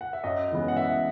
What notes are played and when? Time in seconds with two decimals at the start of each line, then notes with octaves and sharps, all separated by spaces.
0.01 F#5
0.13 E5
0.24 F#2 D#5
0.51 C#3 E3 G#3 B3
0.68 F#5
0.77 F#2 E5